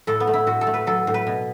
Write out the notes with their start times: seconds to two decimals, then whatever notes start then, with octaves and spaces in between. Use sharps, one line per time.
0.07 A2 A4
0.20 B3
0.27 A3
0.34 E4
0.47 A2 F#4
0.61 A4
0.67 A3
0.74 B4
0.87 F#3 A4
1.07 A2
1.14 B4
1.27 B2